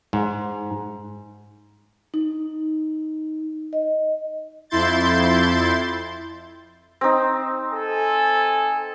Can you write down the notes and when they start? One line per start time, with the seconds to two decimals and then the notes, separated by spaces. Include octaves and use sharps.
0.13 G#2
2.14 D#4
3.73 D#5
4.70 F2 E4 C6 G6 A6
7.01 C4 D#4
7.72 A4 G#5